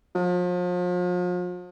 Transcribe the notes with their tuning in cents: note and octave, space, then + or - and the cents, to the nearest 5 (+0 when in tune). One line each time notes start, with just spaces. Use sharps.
F3 +40